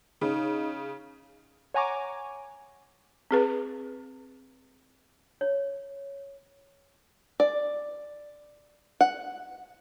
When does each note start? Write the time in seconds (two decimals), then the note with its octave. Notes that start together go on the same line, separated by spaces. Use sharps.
0.21 C#3 D#4
1.74 C#5 F#5 G#5 A#5 C#6 D6
3.31 C4 G#4 B4
5.41 C#5
7.40 D5
9.01 F#5